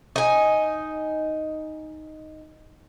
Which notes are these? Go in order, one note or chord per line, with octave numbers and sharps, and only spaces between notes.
D#4 G#5